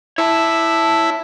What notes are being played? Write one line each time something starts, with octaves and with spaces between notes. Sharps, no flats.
E4 C#5 A5